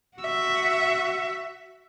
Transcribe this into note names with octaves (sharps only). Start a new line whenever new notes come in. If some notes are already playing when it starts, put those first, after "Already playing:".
F#4 E5